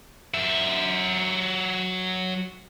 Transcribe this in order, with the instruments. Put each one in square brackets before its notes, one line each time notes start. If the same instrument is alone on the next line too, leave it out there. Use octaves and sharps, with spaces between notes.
[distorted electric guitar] F#3 E5